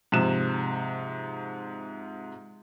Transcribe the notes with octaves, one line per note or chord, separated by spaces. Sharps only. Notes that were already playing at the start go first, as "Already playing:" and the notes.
G#2 C3 F3 F#6 E7